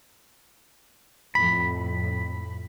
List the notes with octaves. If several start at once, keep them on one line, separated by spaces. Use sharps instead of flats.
F2 A2 B5